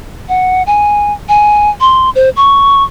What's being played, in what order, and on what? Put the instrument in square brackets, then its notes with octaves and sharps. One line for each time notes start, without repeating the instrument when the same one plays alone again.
[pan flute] F#5
G#5
G#5
C6
C5
C#6